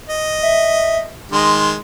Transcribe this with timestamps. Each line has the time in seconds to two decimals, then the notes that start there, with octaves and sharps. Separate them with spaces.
0.09 D#5
0.42 E5
1.32 D#3 G#3 C6